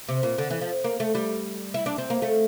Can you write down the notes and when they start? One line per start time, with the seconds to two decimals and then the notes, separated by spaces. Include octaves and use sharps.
0.09 C3
0.23 A#2
0.38 D3
0.50 E3
0.61 F3
0.84 A#3
1.00 A3
1.15 G3
1.74 E4
1.86 D4
1.98 C4
2.10 A#3
2.22 A3